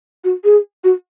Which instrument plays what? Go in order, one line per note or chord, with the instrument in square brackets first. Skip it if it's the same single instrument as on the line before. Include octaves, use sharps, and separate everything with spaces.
[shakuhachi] F#4
G#4
F#4